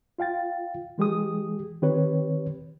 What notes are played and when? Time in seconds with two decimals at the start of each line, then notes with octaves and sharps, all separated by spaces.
0.18 F4 F5 G5 A6
0.98 E3 G#3 G4 G#4 D#6
1.82 D#3 C4 G4 B4 C#5